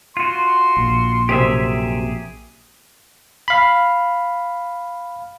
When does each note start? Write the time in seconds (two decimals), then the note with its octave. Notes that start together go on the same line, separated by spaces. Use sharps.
0.17 F4 F#4 C6
0.77 A#1
1.29 F#2 C3 G4 G#4 E5
3.48 F5 B5